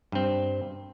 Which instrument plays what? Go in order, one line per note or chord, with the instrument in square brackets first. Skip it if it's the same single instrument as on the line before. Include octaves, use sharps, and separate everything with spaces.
[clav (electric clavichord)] G2 C4